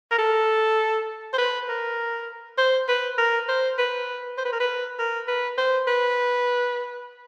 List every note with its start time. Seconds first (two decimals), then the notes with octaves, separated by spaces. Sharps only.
0.11 A#4
0.19 A4
1.33 C5
1.38 B4
1.68 A#4
2.58 C5
2.88 B4
3.18 A#4
3.49 C5
3.78 B4
4.38 C5
4.45 B4
4.52 A#4
4.60 B4
4.99 A#4
5.28 B4
5.58 C5
5.87 B4